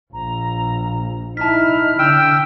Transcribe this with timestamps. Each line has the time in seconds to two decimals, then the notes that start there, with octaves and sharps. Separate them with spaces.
0.13 A#1 A#5
1.37 D#4 E4 A5 F6 B6
1.99 D3 G5 E6 D7